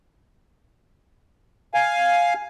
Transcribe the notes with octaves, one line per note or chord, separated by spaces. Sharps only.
F5 G#5